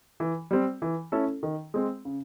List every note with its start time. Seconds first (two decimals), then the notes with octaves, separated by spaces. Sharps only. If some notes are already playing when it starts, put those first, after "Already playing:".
0.20 E3
0.51 G3 C4
0.82 E3
1.12 A3 C#4 E4 A4
1.43 D#3
1.74 G#3 C4
2.05 C#3